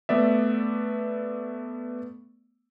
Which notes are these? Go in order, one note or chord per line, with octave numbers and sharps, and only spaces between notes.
A3 B3 D5 E5